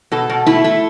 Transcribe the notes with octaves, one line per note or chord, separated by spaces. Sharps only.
B2 A4
B2
A3 E4
A3